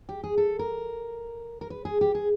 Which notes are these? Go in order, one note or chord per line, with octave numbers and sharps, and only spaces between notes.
G4
G#4
A4
A#4
A#4
B4
G#4
G4
G#4